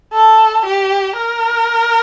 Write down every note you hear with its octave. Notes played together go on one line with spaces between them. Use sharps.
A4
G4
A#4